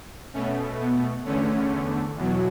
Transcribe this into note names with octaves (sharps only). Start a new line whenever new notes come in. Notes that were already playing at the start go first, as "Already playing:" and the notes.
B2 A3 C#4
B3
E2 D3 A3 C#4
E2 B2 F#3